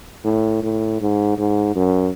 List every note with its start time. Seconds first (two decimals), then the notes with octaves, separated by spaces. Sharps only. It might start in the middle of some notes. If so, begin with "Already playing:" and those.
0.24 A2
0.62 A2
1.01 G#2
1.38 G#2
1.76 F#2